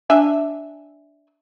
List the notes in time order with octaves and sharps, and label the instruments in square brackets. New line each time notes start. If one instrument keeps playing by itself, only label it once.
[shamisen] D4 E5 G#5